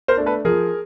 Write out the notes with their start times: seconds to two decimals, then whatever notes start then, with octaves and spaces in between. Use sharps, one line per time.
0.08 A#4 C5
0.17 A3 D4
0.26 A4 B4
0.45 F3 G#4 A#4